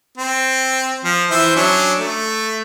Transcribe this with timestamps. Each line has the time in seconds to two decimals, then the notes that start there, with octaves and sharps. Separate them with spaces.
0.18 C4
1.04 F3
1.31 E3 C5 E5
1.56 F#3 C#4 D4
1.99 A3